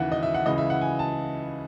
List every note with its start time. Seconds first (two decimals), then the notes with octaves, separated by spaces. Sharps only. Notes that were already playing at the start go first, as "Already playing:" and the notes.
Already playing: D#2 C#3 E3 E5 F#5
0.12 D#5
0.23 E5
0.34 F#5
0.46 C#2 C#3 E3 D#5
0.58 E5
0.70 F#5
0.81 G#5
0.99 A5